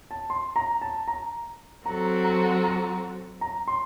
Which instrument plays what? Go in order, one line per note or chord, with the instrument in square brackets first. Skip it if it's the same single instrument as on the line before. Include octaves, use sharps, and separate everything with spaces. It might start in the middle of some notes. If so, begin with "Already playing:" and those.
[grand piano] A5
C6
A#5
A5
A#5
[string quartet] F#3 C4 F#4 A4 [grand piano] A#5
[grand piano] A#5
A#5
A#5
C6